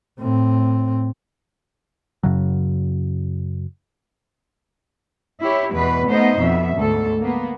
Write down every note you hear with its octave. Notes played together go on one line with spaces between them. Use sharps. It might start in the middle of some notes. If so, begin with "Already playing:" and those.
A2 C4
F#2 C#3 F#3
E4 G4 C#5
E2 B2 B4
A3 B3 D#4 C5 D#5
F2 B2 E5
D2 G#2 A4
A#3 B3